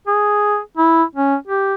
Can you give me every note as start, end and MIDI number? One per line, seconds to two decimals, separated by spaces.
0.08 0.59 68
0.77 1.04 64
1.15 1.35 61
1.47 1.75 67